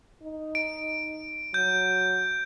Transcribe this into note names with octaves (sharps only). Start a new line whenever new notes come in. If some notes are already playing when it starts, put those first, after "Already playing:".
D#4
D7
F#3 G6